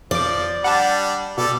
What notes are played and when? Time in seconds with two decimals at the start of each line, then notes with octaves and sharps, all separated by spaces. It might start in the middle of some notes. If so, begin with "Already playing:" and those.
0.11 F2 F3 D5 D6
0.64 G3 D4 F#5 A5
1.38 B2 G3 A4 D5